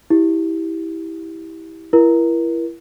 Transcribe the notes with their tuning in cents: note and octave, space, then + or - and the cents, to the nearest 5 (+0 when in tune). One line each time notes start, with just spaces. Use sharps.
E4 -15 G4 +0
E4 +25 A#4 +35